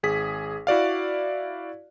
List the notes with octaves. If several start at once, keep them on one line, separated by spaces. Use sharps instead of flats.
G#1 G#4 B6
E4 F#4 D5 F5